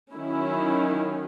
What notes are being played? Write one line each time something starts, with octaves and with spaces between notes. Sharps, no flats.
D#3 F#3 C#4 E4